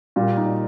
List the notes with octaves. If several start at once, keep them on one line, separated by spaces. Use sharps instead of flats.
A#2 G3 A#3 F4
D#4